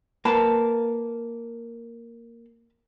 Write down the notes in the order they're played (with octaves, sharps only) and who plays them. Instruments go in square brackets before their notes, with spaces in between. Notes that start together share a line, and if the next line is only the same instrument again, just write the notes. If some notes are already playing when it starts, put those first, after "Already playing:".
[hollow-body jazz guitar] A#3 [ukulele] B4 A5 A#5